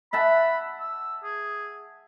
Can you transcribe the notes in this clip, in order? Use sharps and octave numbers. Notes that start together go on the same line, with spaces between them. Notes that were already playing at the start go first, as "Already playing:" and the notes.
E5 F#5 A5 B5
E6
G#4